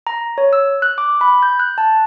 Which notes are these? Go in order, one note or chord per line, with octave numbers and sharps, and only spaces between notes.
A#5
C#5
E6
F#6
D6
B5
G6
F#6
A5